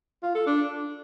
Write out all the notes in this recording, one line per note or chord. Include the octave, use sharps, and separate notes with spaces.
F4
A4
D4